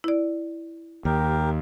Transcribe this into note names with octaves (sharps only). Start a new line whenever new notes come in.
E4 D5
D#2 G4 A#4